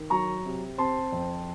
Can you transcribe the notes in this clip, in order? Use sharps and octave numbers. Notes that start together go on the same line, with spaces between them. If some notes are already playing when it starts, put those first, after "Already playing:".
Already playing: D#3
F#3 A#5 C#6
C3
C4 A5 C6
F2